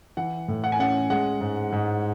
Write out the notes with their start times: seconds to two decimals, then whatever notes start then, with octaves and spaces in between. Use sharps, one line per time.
0.17 E3 F#5
0.48 A2
0.64 F#5
0.72 G#5
0.79 C#4 F#5
1.10 G#3 F#5
1.41 G#2
1.72 G#2